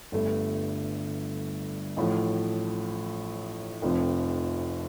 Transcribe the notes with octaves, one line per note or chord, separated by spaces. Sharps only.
G1 G2 D3 A3
A1 A2 F3 A3
F1 F2 F3 C4